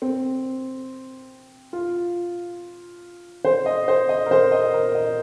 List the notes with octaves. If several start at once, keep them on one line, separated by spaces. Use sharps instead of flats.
C4
F4
C5
D#5
C5
D#5
A#4
C5
D#5
A#4
D#5